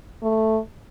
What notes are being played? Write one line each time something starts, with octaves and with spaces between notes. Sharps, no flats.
A3